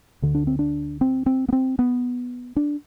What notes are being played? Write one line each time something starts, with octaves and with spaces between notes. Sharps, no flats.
D2 D3
D4
C4
D4
C4
C4
B3
C4
B3
D4